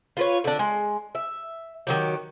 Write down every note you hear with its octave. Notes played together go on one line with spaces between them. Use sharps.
F4 B4 C#5
D3 D4
G#3
E5
D#3 F#3 G4